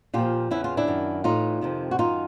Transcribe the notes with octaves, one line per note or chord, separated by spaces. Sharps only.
A#2 F3 F4 G4
E2 C#3 E3 E4
F4
D4 E4
F#2 D#3
A2 E3 D#4 F4
F2 C3 D#3
F#4
F#2 D#3 D#4 F4